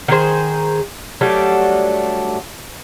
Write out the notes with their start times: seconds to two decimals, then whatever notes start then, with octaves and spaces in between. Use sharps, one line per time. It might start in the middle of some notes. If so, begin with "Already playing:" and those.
0.08 D#3 G#4 C5
1.21 F#3 G3 A3 D4